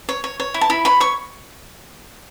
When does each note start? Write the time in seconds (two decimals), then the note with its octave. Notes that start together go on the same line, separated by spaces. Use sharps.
0.09 C#5
0.24 C#5
0.40 C#5
0.54 E4
0.61 A5
0.70 E4 B5
0.85 C#5 B5
1.00 C#5 C#6